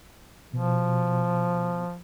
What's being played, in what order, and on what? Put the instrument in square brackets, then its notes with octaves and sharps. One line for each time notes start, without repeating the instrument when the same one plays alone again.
[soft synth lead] B2 [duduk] F3